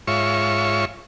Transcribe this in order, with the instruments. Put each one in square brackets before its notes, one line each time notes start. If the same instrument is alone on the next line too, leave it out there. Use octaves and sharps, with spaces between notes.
[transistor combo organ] G#2 F4 C#5 E5 C#6